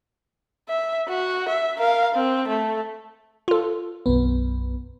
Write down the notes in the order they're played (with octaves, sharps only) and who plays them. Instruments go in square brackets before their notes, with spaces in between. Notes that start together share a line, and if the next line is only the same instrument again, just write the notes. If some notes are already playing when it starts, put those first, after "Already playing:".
[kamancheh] E5
F#4
E5
A#4 F5
C4
A3
[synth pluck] F4 A4
[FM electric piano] B1 F#2 B3